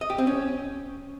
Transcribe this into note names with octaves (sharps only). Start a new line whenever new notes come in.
D#5
G4
C4
C#4